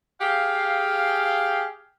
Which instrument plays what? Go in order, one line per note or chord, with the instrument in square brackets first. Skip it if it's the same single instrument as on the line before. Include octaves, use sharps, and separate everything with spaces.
[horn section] G4 G#4 F5